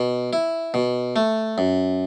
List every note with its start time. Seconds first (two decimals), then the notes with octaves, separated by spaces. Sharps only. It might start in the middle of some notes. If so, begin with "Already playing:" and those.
Already playing: B2
0.33 E4
0.74 B2
1.16 A3
1.58 F#2